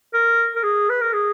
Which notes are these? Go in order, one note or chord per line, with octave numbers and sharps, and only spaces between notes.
A#4
A#4
G#4
B4
A#4
G#4